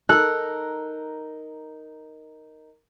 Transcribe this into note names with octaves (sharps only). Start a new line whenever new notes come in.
D#4 A4 A#4 F#6